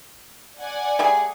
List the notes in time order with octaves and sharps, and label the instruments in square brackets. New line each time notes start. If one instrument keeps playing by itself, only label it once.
[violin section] D5 F#5 G#5
[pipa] G3 A3 G#4